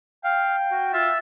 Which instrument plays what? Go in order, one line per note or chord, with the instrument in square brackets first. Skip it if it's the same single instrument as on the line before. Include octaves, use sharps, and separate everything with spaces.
[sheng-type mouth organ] F5 [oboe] G5
[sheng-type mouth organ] F#4
[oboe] F4 [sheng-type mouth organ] E5 E6